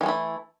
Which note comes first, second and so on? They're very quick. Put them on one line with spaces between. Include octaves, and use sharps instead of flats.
E3 G#3 A3 E4